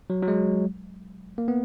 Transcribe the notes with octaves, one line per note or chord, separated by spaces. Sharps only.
F#3
F#3
G#3
A#3
B3